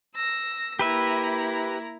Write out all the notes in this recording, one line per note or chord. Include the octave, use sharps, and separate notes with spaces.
E6 A#6
A#3 E4 G4 B4 E5 A#5